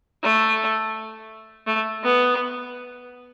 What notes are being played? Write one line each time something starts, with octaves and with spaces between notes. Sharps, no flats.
A3
A3
B3